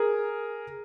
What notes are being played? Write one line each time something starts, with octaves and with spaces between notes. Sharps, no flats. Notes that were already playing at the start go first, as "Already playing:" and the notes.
Already playing: G#4 A#4